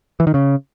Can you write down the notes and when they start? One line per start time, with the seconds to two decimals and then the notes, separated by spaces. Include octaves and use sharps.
0.20 E3
0.27 D#3
0.34 C#3